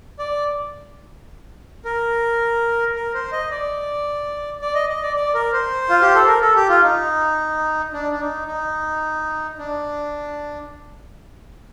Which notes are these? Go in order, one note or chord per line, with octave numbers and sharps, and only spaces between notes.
D5
A#4
A#4
C5
D#5
D5
D5
D#5
D#5
D5
D5
A#4
C5
F4
G4
A4
A#4
A4
G4
F4
D#4
D4
D4
D#4
D#4
D4